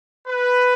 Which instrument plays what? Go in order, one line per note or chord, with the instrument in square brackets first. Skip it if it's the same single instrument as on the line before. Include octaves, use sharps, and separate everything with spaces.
[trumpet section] B4